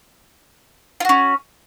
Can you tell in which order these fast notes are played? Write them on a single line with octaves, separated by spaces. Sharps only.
F4 F#4 C#4